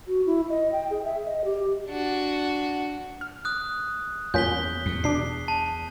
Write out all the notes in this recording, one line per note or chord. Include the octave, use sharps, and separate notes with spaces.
F#4
E4
D#5
G5
G#4
E5
D#5
G4
D4 F#4
F6
D#6 F#6
E2 A#3 C#4 F4 G6 B6 G7
E2 C7 C#7
B2 D4 D6 C7
A5